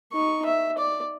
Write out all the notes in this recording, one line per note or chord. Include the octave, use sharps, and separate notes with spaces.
D#4 C#6
E5
D5